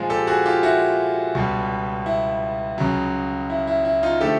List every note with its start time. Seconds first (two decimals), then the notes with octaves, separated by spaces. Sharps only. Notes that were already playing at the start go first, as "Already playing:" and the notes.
Already playing: A#2 F3 G#3
0.10 G4 A4
0.27 F#4 G#4
0.46 F4 G4
0.63 E4 F#4
1.35 C#2 B2 G3
2.06 E4
2.78 C#2 C#3 F#3
3.50 E4
3.67 E4
3.85 E4
4.03 D#4 F4
4.21 D3 F3 A3 G4 A4